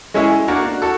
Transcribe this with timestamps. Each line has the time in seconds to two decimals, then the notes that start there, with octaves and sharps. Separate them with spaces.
0.14 G#3 C#4 E4 G#4
0.48 A#3 D4 F#4 A#4
0.82 F#4 A4